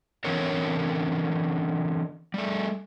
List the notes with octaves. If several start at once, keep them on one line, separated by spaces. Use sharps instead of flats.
D3 E3 C4 C#4 A#4 C#5
G3 A3